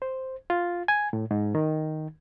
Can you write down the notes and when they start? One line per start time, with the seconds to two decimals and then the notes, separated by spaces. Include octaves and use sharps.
0.02 C5
0.50 F4
0.88 G#5
1.13 A2
1.31 G#2
1.55 D#3